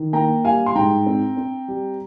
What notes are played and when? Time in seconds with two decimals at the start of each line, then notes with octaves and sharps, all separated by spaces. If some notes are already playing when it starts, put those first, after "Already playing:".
Already playing: D#3
0.13 A#3 G5 A#5
0.45 G3 F5 G#5
0.66 C6
0.75 G#2 G5 A#5
1.06 C4
1.37 C4
1.68 G3